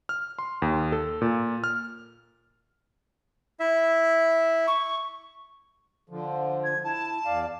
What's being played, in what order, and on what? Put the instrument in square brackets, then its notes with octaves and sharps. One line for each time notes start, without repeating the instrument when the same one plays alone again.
[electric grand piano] F6
C6
D#2
A4
A#2
F6
[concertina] E4 E5
[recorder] C#6
[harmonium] D3 F3
[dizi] G#6
[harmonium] E4 [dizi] A5
[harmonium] E2 D5 F5